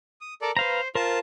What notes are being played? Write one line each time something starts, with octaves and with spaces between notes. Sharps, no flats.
D#6
A4 A#4 D5
B4 C5 F5 A#5
F4 A#4 C5 A5